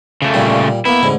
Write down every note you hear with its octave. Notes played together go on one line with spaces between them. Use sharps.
C#3 A3
A#2 G3
A#3 B3 E4
A1 G#2 D3